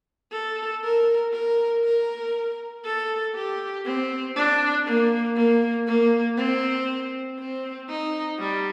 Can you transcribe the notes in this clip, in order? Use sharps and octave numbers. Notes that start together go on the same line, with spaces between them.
A4
A#4
A#4
A#4
A4
G4
C4
D4
A#3
A#3
A#3
C4
C4
D#4
G3